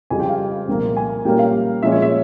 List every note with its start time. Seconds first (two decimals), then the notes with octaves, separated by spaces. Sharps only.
0.10 F2 C#3 G3 G#5
0.20 G5
0.29 F5
0.68 C2 A#2 F3 A#3
0.97 G#5
1.25 A#2 G3 A#3 C#4 G5
1.39 F5
1.83 A#2 F3 G#3 C#4 E5
1.92 C#5
2.02 E5